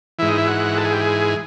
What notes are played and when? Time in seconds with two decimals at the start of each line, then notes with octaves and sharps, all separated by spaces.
0.19 G#2 E3 E4
0.28 D#4
0.38 E4
0.47 F#4
0.77 A4
0.85 G#4
0.93 G4
1.01 G#4